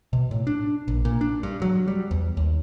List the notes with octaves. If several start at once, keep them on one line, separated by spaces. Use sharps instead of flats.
B2
A2
D4
A#1
A#2
D4
G2
F#3
G3
E2
D#2